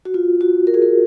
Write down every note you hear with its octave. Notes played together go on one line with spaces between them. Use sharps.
F#4
F4
F#4
A#4
G#4
A#4